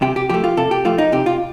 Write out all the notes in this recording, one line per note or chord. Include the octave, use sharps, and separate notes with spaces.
C3 G4
G4
F3 A3 G4
F4
C3 A4
G4
F3 A3 F4
D#4
C3 G4
F4